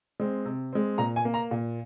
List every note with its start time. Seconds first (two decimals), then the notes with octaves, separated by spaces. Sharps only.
0.20 G#3 C4
0.45 C3
0.73 G#3 C4
0.98 A#2 A#5
1.16 G#5
1.25 A#3
1.34 A#5
1.51 A#2